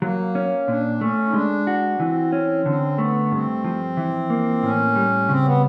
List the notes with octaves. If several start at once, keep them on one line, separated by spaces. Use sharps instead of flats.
F#3 A#3
C#4
A#2 D4
A3 C#4
D#4
G#3 D4
F#4
B3
E3 C4
C#4
D3 C4
A3 B3
G2 C4
F3
E3
A#3
A2 C#4
G3
C#3 C4
B3